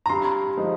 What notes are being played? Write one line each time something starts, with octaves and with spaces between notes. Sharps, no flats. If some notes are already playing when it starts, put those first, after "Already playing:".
A#5
G2 C6
F3 G#3 D#4